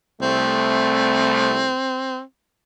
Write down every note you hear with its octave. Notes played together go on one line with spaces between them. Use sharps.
C2 A3 C4